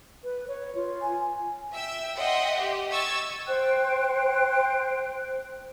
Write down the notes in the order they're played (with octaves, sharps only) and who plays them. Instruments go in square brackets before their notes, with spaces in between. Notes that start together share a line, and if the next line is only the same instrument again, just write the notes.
[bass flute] B4
C#5
F4
[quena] G#5
[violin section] E5 G5 E6
D#5 E5 F#5 G5 C6
G4
D#5 C#6 E6 G#6 A6
[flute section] C5 G5 F#6